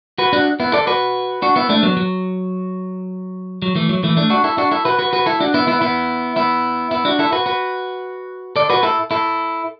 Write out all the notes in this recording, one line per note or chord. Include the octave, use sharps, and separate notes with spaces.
F#4 B4
D4 F#4
B3 E4
A4 D5
F#4 B4
D4 F#4
B3 E4
A3 D4
F#3 B3
F#3
F#3
E3 A3
F#3
E3 A3
A3 D4
D4 F#4
E4 A4
D4 F#4
E4 A4
F#4 B4
F#4 B4
F#4 B4
E4 A4
D4 F#4
B3 E4
B3 E4
B3 E4
B3 E4
B3 E4
D4 F#4
E4 A4
F#4 B4
F#4 B4
A4 D5
F#4 B4
E4 A4
E4 A4